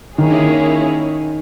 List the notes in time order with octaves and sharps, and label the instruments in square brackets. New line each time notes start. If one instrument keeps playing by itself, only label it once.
[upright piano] D#3 [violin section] A#3 C#4 E4 G#4 C#5